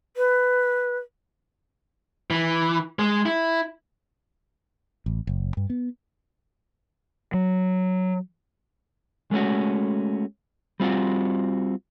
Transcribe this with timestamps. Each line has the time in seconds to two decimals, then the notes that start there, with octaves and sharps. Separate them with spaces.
0.17 B4
2.30 E3
2.99 G#3
3.26 E4
5.06 A1
5.27 F#1
5.57 G2
5.70 B3
7.34 F#3
9.31 G#3 A3 B3 C#4 F#4
10.80 G3 C4 F4 F#4